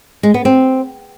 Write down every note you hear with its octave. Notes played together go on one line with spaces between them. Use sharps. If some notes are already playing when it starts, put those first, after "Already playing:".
G#3
B3
C4